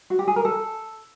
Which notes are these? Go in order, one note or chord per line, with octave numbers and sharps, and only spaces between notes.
F#4
G4
G#4
A#4
A4